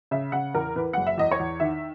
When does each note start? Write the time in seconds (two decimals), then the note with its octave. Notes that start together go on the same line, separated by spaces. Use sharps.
0.11 C#3 E5
0.32 C#3 F#5
0.54 E2 A#4
0.76 E3 B4
0.93 F#1 F#5
1.07 E5
1.18 E2 D#5
1.31 C#5
1.39 E2
1.60 D#3 E5